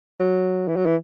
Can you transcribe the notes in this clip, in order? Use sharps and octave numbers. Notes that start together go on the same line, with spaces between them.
F#3
E3
F#3
E3